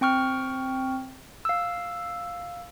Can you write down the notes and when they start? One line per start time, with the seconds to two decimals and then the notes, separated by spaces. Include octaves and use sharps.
0.01 C4 G5 C#6 F6
1.45 F5 E6